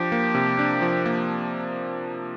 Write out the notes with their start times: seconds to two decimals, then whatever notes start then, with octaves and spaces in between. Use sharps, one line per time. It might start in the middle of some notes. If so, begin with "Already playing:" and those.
Already playing: F3 D4 G4
0.12 A#3
0.35 C3
0.59 D4
0.82 F3
1.06 A#3